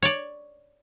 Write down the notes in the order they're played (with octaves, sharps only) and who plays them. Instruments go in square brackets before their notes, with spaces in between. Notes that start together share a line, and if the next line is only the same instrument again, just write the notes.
[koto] C#5 D5